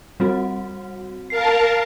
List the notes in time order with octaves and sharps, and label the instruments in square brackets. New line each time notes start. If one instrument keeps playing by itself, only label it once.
[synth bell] G3 C4 F#4
[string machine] A#4 F5 A5 [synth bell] C7